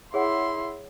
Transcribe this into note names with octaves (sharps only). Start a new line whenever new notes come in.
E4 G#4 C#5 F#5 C6